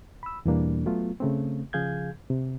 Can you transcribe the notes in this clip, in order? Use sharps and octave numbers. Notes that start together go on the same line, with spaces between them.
B5 E6
E2 B2 E3 G3 A#3 D4
F#3 A3 B3 F4
C#3 A3 C4
C#3 F3 G#4 F5 G6 G#6
C3